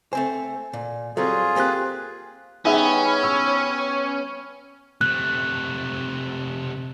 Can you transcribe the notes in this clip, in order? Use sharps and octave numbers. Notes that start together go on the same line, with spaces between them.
A3 C4 C5 G#5
A#2
F#3 G3 C4 F4 G#4 A4
A#3 C4 G4 G#5 F#6
G3 B3 C#4 D#4 G#4 E5
C#6 E6
C#5
C3 A3 F#6